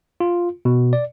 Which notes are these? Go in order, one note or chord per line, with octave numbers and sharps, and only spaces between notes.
F4
B2
D5